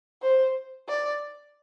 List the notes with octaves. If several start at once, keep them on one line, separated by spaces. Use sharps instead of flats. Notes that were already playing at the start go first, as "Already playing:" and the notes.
C5
D5